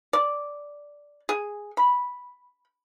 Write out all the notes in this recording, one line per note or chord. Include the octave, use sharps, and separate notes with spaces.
D5
G#4
B5